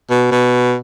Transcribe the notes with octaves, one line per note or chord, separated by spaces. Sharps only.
B2
B2